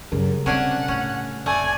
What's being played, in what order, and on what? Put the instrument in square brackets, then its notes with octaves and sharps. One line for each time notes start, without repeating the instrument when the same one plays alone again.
[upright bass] F#2 [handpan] C#3 G3 A#4
[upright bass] C3 [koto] C#4 D4 G#5 [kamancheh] F#5
[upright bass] A2 [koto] C#4
[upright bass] F1 [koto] A3 [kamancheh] D5 G#5